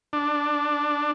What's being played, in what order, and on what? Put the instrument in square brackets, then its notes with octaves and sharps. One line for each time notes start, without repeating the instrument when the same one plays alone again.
[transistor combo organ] D4